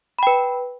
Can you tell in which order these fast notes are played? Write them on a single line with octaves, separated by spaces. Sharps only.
B5 G5 B4